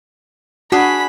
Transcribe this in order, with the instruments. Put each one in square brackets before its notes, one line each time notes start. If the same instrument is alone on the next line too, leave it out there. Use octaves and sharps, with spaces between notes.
[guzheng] D4 G#4 [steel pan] F#4 [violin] B5 B6